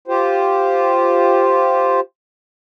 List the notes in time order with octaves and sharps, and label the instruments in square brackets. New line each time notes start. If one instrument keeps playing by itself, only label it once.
[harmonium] F4 G4 C5